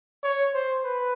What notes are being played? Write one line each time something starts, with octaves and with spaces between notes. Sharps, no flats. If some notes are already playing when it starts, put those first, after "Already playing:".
C#5
C5
B4